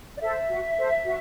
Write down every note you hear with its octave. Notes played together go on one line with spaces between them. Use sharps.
D5
A4 C5 E5
F#4
A4 C5
F#4